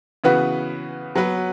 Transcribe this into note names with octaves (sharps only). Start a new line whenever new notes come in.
C#3 E3 B3 F#4 B4
F#3 B3 F#4 B4